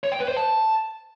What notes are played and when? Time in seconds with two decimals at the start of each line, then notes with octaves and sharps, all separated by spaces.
0.04 C#5
0.12 G5
0.20 B4
0.28 C5
0.37 A5